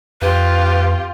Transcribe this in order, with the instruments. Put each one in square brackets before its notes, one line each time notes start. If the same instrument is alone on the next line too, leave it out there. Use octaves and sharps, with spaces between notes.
[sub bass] F2 [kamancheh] F4 G4 [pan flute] B4